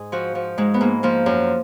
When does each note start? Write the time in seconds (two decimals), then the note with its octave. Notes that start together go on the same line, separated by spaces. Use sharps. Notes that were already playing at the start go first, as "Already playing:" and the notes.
Already playing: G#2 G#4
0.12 F3 F#4
0.35 F3
0.58 G#2 G#3
0.74 B3
0.81 G#2 A#3
1.03 F3 A#3
1.26 F#2